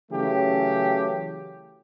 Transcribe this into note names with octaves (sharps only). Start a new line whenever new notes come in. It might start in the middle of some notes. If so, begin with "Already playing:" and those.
C#3 E3 F#3 A3 C#4 G4